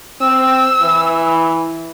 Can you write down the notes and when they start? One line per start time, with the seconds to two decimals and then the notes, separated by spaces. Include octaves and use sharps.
0.21 C4 E6
0.81 E3